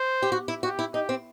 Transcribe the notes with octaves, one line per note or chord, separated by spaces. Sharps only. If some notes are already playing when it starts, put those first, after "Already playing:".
Already playing: C5
G4
F#4
E4
F#4 G4
E4
D#4 G4
C4